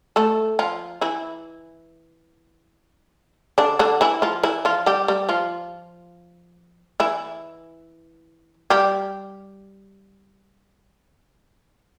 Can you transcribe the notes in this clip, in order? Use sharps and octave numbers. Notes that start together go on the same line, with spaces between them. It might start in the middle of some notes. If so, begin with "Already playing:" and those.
A3 A4
F3 F4
E3 E4
D3 D4
D3 D4
E3 E4
F3 F4
E3 E4
F3 F4
G3 G4
G3 G4
F3 F4
E3 E4
G3 G4